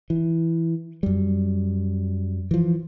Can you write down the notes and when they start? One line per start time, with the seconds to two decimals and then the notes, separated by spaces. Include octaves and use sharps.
0.10 E3
1.03 F#2 G3
2.51 E3 F3